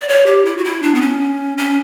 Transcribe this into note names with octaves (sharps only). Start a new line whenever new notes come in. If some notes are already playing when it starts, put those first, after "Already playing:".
D5
C#5
G4
E4
F#4
E4
D4
B3
C#4
C#4